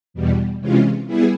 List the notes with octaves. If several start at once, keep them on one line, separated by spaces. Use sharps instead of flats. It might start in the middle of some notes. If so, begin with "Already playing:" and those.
E2 B2 G3
C3 E3 G#3 C#4 F4
G3 B3 E4 G#4